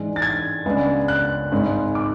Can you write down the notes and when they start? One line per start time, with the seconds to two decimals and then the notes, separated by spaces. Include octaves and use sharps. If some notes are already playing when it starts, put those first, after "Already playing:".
Already playing: G#2 E3 G#3 D4
0.16 A6
0.22 G#6
0.66 C#2 C#3 G#3 B3 D4
1.08 F#6
1.52 G#1 G#2 G#3
1.95 D6